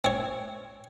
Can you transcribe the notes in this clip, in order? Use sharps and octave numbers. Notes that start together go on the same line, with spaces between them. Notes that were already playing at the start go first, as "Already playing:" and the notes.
C4 C#5